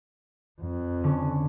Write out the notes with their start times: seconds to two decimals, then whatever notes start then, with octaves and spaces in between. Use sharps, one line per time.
0.61 F2
1.04 D3 C#4